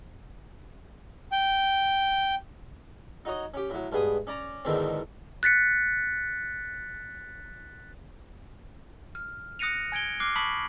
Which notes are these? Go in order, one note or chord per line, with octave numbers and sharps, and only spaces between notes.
G5
D#4 F#4 C#5 D#5
C#4 G4
A2 F#3
G2 G#3 B3 G#4 D#6
C#4 D5 A#5
E2 G#2 B2 D3 D#3 C4
F#6 A6 B6 C#7
F6
D#6 F#6 A#6 C#7 D#7 F7
G#5 G#6 D7 G7
D6 F6 F#6 C7
A5 B5 C#6 D#6 B6 F#7